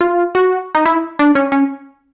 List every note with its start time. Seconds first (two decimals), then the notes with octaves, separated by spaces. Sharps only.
0.01 F4
0.35 F#4
0.75 D#4
0.85 E4
1.19 D4
1.35 C#4
1.52 C#4